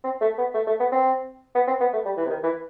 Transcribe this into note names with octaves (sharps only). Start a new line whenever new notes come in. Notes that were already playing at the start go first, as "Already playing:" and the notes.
C4
A3
B3
A3
A3
B3
C4
B3
C4
B3
A3
G3
E3
C3
D#3
E3